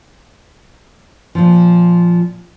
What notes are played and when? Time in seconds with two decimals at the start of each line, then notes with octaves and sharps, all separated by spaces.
1.35 A#2 F3